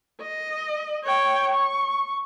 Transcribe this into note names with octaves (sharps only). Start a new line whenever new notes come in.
D#5
C#5 G5
C#6